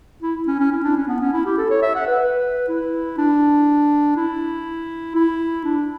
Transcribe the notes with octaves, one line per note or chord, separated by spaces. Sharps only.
E4
C#4
C#4
E4
D4
C#4
B3
C#4
E4
G4
A4
C#5
E5
F#5
B4
B4
E4
D4
E4
E4
D4